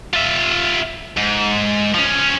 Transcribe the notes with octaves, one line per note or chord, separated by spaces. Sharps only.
F4 E5
G#2
F3 C#4